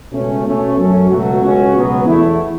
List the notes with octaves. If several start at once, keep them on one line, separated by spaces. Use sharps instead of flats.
C#2 B2 A3 C#4
B2 A3 C#4
F#2 F#3 C#4 A4
C#2 B2 F#3 A3 F#4
C#2 C#3 A3 C#4
C#2 B2 F#3 B3
E2 E3 A3 E4